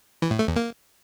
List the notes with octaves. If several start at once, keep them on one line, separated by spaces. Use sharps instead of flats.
E3
A2
A3
E2
A#3